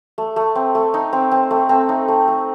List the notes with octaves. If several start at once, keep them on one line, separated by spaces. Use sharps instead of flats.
A3
A3
C4
A3
D#4
C4
C4
A3
C4
D#4
A3
A3